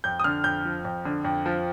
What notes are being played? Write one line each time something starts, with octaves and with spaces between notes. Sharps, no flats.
F2 G6
D#6
D3 F6
F2 G6
F3
F2
D3
F2
F3